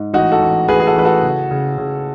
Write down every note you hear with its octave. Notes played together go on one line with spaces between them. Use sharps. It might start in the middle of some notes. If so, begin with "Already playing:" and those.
Already playing: G#2
A1 D#4 F#4
F#4 A4
A1
A1 G#4 B4
G#4
F#4 A4
A1 B4
F#4 A4
C#3
C#3
C#3